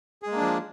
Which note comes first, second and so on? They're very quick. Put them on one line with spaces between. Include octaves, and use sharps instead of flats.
G#4 G#3 A#3 D4 F3